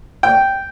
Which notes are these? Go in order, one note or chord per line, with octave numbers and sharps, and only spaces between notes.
G5